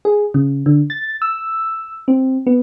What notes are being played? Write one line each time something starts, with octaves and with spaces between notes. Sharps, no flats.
G#4
C#3
D3
A6
E6
C4
B3